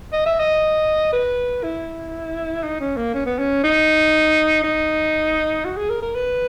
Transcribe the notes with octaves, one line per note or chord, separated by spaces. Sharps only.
D#5
E5
D#5
B4
E4
D#4
C#4
A#3
C#4
B3
C#4
D#4
D#4
F#4
G#4
A#4
A#4
B4